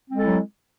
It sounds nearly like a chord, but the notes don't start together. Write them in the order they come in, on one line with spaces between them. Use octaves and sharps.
C4 G#3 A4 E4 F#3